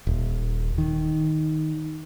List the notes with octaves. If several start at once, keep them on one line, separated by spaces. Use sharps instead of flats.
D#1
D#3